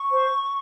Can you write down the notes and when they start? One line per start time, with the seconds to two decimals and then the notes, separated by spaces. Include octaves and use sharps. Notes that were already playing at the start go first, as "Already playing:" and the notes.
Already playing: C#6
0.09 C5